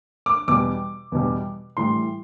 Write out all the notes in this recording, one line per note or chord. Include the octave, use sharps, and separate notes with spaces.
D6
E2 B2 G3 D6
E2 B2 G3
A2 E3 G3 C6